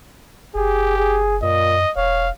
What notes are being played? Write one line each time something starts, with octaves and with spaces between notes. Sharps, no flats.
F#1 G4 G#4
G#4
F#2 A#2 D#5
E1 C#5 F5